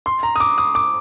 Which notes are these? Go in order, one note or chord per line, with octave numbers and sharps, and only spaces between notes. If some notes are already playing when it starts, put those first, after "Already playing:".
C6
A#5
D#6
D6
D#6
D6